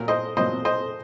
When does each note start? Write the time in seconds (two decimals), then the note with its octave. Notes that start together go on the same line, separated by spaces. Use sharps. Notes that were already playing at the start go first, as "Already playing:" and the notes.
Already playing: A#2 F#3 A#4
0.08 C5 D#5
0.37 A#2 F#3 C5 D#5
0.65 C5 D#5